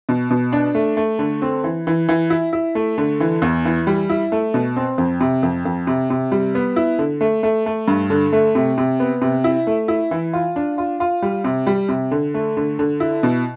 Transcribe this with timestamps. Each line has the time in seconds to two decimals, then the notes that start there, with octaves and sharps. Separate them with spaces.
0.09 B2
0.30 B2
0.52 D4
0.75 A3
0.97 A3
1.19 D3
1.42 C4
1.64 E3
1.87 E3
2.08 E3
2.30 E4
2.53 E4
2.75 A3
2.98 D3
3.20 E3
3.42 E2
3.65 E3
3.87 G3
4.09 E4
4.32 A3
4.54 B2
4.76 C4
4.98 F2
5.21 C3
5.43 F2
5.65 F2
5.87 C3
6.10 C3
6.32 G3
6.55 B3
6.76 E4
6.99 D3
7.21 A3
7.43 A3
7.66 A3
7.88 G2
8.10 D3
8.33 A3
8.55 C3
8.78 C3
9.00 B3
9.22 C3
9.44 E4
9.67 A3
9.88 E4
10.11 E3
10.33 F4
10.56 D4
10.78 F4
11.00 F4
11.22 G3
11.44 C3
11.67 G3
11.89 C3
12.11 D3
12.34 A3
12.57 D3
12.79 D3
13.00 E4
13.23 B2